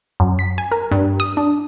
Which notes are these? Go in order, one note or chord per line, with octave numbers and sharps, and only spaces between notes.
F#2
B6
G#5
A#4
G2
D#6
D4